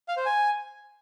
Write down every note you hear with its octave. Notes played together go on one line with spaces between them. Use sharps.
F5
C5
G#5